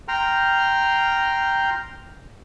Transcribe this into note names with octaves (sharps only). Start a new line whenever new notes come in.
G5 A#5 C6 F6